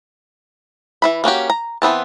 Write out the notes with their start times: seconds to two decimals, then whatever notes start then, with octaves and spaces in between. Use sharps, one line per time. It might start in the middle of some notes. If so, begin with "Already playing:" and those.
1.02 E3 E4 B5
1.24 A#3 C#4 F#4 G4
1.50 A#5
1.82 E3 B3 C4 A5